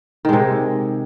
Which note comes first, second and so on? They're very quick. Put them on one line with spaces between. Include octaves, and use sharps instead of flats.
D#3 G#3 C3